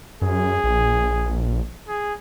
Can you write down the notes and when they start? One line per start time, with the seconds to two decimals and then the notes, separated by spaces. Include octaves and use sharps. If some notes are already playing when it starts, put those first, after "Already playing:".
0.22 F#2 G#4
0.64 A#1
1.88 G#4